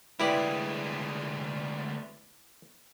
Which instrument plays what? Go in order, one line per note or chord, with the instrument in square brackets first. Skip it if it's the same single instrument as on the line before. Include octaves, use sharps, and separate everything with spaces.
[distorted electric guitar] D2 G#3 [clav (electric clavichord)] E4 G4 D5 [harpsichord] B4